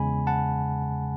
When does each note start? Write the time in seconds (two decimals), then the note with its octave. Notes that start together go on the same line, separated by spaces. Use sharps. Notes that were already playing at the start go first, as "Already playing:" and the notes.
Already playing: E2 C#3 G#3 G#5 B5
0.27 F#5 A5